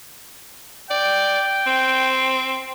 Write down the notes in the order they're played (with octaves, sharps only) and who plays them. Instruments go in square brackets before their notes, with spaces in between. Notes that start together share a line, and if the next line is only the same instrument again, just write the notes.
[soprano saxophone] D5 [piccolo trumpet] G5
[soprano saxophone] C4